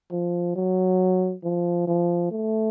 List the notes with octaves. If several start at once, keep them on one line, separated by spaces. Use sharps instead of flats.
F3
F#3
F3
F3
A3